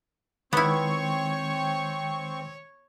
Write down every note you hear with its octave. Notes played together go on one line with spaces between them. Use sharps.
D#3 G#3 B3 C4 E4 C#5 C#6